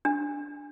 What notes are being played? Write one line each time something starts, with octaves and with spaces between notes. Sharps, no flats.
D4